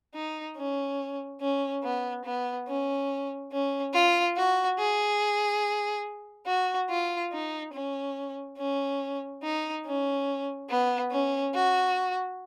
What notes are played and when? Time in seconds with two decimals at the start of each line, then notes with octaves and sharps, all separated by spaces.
0.15 D#4
0.57 C#4
1.41 C#4
1.83 B3
2.25 B3
2.68 C#4
3.52 C#4
3.93 F4
4.36 F#4
4.79 G#4
6.47 F#4
6.90 F4
7.32 D#4
7.73 C#4
8.58 C#4
9.43 D#4
9.86 C#4
10.69 B3
11.11 C#4
11.54 F#4